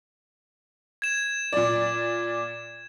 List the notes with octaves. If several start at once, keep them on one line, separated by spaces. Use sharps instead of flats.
G#6 E7
A#2 D5